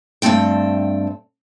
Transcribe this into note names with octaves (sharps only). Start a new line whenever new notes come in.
G2 D3 A3 C4 G5